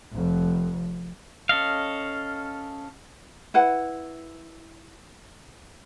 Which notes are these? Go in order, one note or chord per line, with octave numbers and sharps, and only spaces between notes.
F1 F2
C#4 A4 D#5 F5
E4 B4 F#5